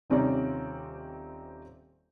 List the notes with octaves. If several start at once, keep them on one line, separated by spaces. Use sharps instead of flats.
D#1 C3 C4 C#4 D#4 D5